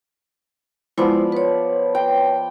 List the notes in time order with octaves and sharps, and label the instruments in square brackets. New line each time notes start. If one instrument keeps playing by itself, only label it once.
[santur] F3 B3 D5 [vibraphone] G#3 E4 C5
[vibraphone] B4 C#5
[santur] G5